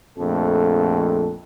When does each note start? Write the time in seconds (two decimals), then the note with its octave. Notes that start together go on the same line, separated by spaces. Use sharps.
0.19 A#1 F2 A3 A4